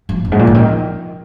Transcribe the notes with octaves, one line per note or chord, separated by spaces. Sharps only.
F3
F2
G#2
A#2
C#3
D#3